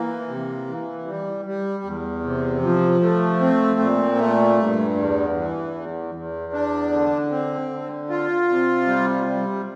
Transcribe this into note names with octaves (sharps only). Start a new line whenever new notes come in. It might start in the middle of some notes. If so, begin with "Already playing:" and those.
Already playing: E3 A#3
C3
E3
G3
G3
E2
C3
F3
A3
C4
A#2
A3
G2
E2
E3
E2
E2
D4
D3
C4
D3
F4
C3
G3
G3